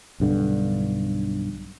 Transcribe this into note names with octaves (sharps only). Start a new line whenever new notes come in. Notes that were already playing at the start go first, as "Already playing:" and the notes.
B1 G2 D3